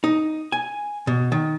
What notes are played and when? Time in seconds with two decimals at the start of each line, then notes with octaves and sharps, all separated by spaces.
0.04 D#4
0.52 G#5
1.07 B2
1.32 D#3